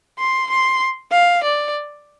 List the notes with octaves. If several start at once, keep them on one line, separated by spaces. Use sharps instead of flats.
C6
C6
F5
D5